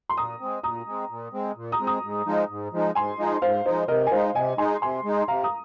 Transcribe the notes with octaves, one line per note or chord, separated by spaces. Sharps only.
C6
A#2 A#5 D#6
G#3 C4
A#2 A#5 D#6
G#3 C4
A#2
G#3 C4
A#2
A#5 D#6
G#3 C4
A#5 D#6
G#2
F3 G#3 D#4
G#2
F3 G#3 D#4
G#2 G#5 C6
F3 G#3 D#4
G#2 C5 F5
F3 G#3 D#4 C5
C3 A#4 D#5
G#5
G#3 D#4 C5 F5
C3 D#5 G#5
G#3 D#4 G#5 C6
C3 G#5 C6
G#3 D#4
C3 F5 A#5
A#5 D#6